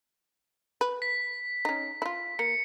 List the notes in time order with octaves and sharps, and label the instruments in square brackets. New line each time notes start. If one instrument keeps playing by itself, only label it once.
[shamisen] B4
[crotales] B6
[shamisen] C#4 D#4
E4 F4
[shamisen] A#3 [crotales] C#7